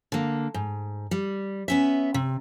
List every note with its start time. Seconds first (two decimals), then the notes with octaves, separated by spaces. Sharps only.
0.12 D3 A#3
0.54 G#2
1.11 G3
1.68 B3 C#4 E5
2.14 C3